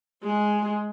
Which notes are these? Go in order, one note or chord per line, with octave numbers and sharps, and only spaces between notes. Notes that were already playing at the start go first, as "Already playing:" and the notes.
G#3